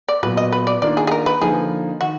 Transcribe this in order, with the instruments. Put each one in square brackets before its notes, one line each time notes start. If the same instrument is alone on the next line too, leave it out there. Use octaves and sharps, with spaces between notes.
[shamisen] D5
[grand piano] A#2 F#3 B3 [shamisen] B4
[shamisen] D#5
B4
D5
[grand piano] D#3 A#3 D4 F4 [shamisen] D5
[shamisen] G#4
G#4
A#4
B4
[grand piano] D3 F3 A#3 D#4 [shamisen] G#4
[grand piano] D#3 [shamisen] F#4